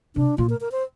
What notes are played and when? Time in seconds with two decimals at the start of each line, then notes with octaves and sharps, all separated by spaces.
0.16 C3 D4
0.38 A#2 F4
0.49 A#4
0.61 A#4
0.72 C5